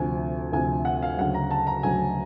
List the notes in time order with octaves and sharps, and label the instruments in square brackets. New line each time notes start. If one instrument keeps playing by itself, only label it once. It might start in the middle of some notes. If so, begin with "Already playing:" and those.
Already playing: [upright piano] D2 C3 F3 G#5
D2 C3 F3 G#5
F#5
F5
D2 C#3 F#3 F#5
A#5
A5
A#5
D2 C#3 F#3 G#5